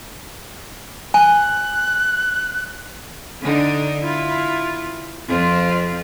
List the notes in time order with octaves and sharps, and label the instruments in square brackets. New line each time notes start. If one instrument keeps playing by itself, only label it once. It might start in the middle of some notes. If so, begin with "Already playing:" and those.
[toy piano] G#5 [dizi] F#6
[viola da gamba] D3 D4 D#4
E4 F4
F2 C4 F4